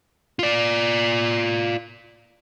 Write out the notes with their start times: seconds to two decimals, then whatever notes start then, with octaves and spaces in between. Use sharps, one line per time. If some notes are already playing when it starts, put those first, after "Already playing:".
0.39 F4 D5